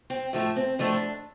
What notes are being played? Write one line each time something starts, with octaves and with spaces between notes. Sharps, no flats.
C4
A2 F3 A3
C4
A2 F3 A3 D4